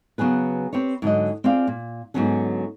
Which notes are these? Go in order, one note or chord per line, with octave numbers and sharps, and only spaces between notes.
C#3 F#3 B3 G#4 B4
C4 G4 B4 C#5
G#2 D3 F#3 D#5
C4 F4 G#4 D5 F5
A#2
G#2 D3 F#3 B3 C#4 G#4